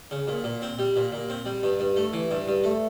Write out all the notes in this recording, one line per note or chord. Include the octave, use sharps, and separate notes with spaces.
C#3
A#2
A#2
C4
G3
A#2
A#2
C4
G3
G2
G2
A3
E3
G2
G2
A3